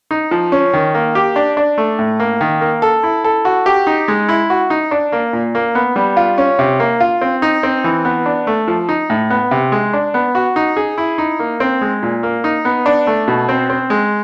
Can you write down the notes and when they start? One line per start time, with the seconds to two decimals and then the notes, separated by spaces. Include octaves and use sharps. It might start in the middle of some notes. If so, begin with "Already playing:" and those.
0.11 D#4
0.31 F3
0.52 C#4
0.73 D#3
0.95 A#3
1.15 G4
1.36 D4
1.57 D4
1.78 A3
1.99 A2
2.20 A#3
2.41 D#3
2.61 A#3
2.82 A4
3.03 E4
3.24 A4
3.45 F#4
3.66 G4
3.87 D#4
4.08 G#3
4.29 E4
4.50 F#4
4.70 D#4
4.91 D4
5.12 A#3
5.33 A#2
5.55 A#3
5.75 B3
5.96 G3
6.17 F4
6.38 C#4
6.59 C3
6.80 A#3
7.00 F4
7.21 C4
7.42 D#4
7.63 C4
7.84 E3
8.05 B3
8.26 D4
8.47 A3
8.68 F3
8.89 D#4
9.10 A2
9.30 B3
9.51 C3
9.72 G#3
9.93 D4
10.14 B3
10.35 F#4
10.56 D#4
10.77 G#4
10.98 E4
11.18 D#4
11.39 A#3
11.60 C4
11.81 G#3
12.03 A#2
12.23 A#3
12.44 D#4
12.65 B3
12.86 D4
13.07 A3
13.28 B2
13.49 C4
13.70 C4
13.90 G#3